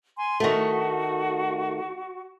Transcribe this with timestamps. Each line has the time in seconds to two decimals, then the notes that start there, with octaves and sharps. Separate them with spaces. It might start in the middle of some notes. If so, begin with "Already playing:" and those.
0.17 G#5 C6
0.40 D#3 A3 F#4